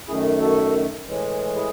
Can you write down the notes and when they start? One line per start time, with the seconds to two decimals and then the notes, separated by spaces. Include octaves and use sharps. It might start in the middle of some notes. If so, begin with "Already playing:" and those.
0.07 F#2 D#3 A3 E4 G#4
0.40 F#4 A4
1.06 A2 E3 G#3
1.55 E4 G#4